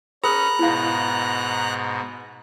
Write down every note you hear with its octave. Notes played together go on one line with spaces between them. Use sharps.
C#4 G#4 A#4 A#5 B5 D#6 F#6
G#2 B2 E4 F5